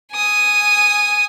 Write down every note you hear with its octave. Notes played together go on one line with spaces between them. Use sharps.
G#5 D#6